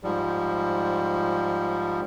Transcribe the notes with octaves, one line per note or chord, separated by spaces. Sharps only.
G#2 F3 G3